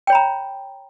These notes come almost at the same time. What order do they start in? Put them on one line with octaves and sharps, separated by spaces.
G5 C#5 B5 A#5